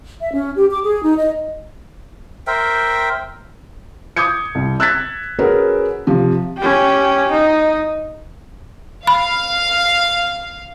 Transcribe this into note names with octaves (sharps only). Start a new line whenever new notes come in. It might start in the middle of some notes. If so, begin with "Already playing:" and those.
E5
C#4
G4
D6
G#4
D#4
D#5
A#4 C5 E5 G5
D6 D#6 G6 G#6 C#7
C2
E6 F#6 G#6 A6 B6
C#4 F#4 G#4 A#4 B4
C3 F3
C#4 G4
D#4
F5 B5